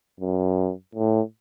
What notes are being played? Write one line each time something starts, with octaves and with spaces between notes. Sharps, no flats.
F#2
A2